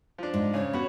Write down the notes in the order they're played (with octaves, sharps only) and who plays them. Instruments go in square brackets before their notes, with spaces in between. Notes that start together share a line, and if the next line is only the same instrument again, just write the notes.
[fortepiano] F3 D4
[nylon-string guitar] G#2
[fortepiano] C#3 [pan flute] C#5
[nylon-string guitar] B3 [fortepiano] F#4 B5